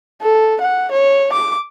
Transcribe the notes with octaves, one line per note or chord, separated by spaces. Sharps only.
A4
F#5
C#5
D6